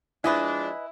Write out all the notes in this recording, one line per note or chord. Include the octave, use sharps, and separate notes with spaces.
F3 G#3 D4 E4 B4 D#5 G#5